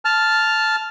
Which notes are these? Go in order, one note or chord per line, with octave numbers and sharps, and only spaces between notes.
A5 F6